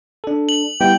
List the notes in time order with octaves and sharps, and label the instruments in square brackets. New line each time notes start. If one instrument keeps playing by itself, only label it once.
[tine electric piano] D4 A4
[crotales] F#7
[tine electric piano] G3 B3 E4 [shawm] G5